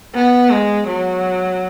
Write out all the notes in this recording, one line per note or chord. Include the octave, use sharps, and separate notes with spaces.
B3
G#3
F#3